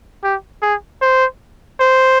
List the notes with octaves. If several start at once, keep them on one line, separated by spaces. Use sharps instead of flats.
G4
G#4
C5
C5